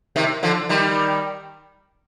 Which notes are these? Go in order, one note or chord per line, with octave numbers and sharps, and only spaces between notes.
C3 D#3
D3 F3
D#3 G3